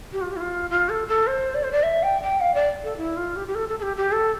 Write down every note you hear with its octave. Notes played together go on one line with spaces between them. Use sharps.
G4
F4
G4
E4
F4
F4
A4
A4
C5
D5
C5
D5
E5
G5
G5
F5
D5
A4
E4
F4
G4
G4
A4
A4
A4
G4
G4
A4